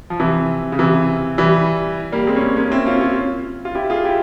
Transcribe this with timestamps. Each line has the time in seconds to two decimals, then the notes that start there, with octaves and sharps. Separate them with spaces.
0.10 F3
0.20 C3 E3
0.72 C#3
0.79 C3 E3
1.38 E3 G3
2.12 G3 A#3
2.27 G#3 C4
2.36 C#4
2.42 G#3 C4
2.56 A#3 C#4
2.71 C4 E4
2.86 C#4 F4
3.01 C#4 F4
3.65 F4
3.75 E4 G4
3.90 F4 G#4
4.05 E4 G4